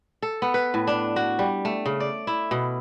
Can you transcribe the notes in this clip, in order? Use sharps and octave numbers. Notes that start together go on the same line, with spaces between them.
A4
B3
B4
A2
D4
F#4
G3
A3
C#3
D5
E4
B2